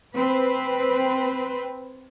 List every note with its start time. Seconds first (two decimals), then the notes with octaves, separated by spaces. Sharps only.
0.15 C4 B4